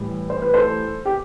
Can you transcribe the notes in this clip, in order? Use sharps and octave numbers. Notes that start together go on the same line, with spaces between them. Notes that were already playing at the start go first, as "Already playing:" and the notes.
Already playing: A2 E3 G3
C5
B4
A4 C5
G4